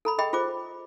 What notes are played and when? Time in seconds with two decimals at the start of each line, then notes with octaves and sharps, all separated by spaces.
0.05 A4 A#5 B5
0.18 G#4 D#5 G5 B5
0.33 F4 G#4 C5 D6